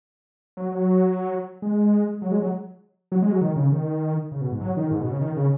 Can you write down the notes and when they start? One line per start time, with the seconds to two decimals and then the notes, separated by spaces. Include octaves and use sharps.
0.57 F#3
0.72 F#3
1.62 G#3
2.22 F#3
2.32 G#3
2.42 F#3
3.12 F#3
3.22 G#3
3.32 F#3
3.41 D#3
3.56 C#3
3.72 D#3
4.32 C#3
4.41 B2
4.51 G#2
4.61 F#3
4.77 D#3
4.91 G#2
5.01 B2
5.11 C#3
5.21 D#3
5.37 C#3